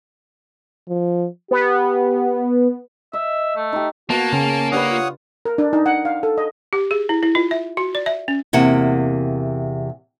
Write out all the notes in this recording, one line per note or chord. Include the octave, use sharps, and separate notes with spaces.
F3
B3 G4
D#5 E5
A3
D#4 G4
A#3 B3 F#4 A5
C#3 C#4
D4 G4 B4 C#5 F#5 D#6
F4
A#4
D4
D#4
F#5
F5
A4
D#5
G4
G#4
E4
E4
F4
E5
F#4
D5
E5
C#4
E2 C3 A#3 F#5